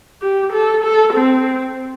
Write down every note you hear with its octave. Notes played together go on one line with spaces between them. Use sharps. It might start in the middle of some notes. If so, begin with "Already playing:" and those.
G4
A4
A4
C4